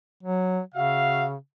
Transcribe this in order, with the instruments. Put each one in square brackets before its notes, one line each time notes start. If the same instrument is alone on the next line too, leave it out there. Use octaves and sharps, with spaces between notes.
[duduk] F#3
[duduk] C#3 [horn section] F#4 E5 F5